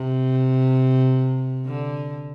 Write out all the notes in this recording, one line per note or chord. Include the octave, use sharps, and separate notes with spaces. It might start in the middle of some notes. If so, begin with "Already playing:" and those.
Already playing: C3
D3